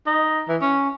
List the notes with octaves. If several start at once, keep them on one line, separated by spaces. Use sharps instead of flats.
D#4
E3
C#4